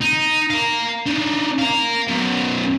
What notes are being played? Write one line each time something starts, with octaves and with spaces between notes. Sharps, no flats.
D#4
F5 A#5
D4 D#4
F5 A#5
F#2 B2